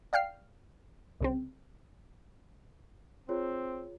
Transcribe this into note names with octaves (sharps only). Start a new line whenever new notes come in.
D5 F5 G5 F6 C7
C2 C#3 C4
C4 F4 G#4 C#5